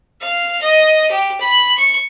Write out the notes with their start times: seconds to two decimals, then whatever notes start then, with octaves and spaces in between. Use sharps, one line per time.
0.22 F5
0.62 D#5
1.11 G4
1.40 B5
1.78 C#6